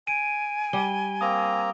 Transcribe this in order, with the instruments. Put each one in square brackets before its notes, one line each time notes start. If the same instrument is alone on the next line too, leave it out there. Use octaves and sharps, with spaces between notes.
[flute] G#5 [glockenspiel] D7 D#7
[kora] G3 [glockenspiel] G7
[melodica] A#3 C4 A#5 [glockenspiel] D#6